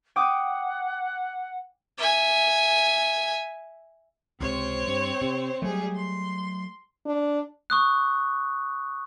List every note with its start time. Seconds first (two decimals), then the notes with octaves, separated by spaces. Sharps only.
0.16 F#5 G5 D6 D#6
1.98 E5 G#5
4.41 C#2 C3 C4 C5 C#5
4.87 G2
5.21 C3
5.62 F#3 G3 A3 G#4
5.94 C6
7.06 D4
7.70 C#6 D#6 F#6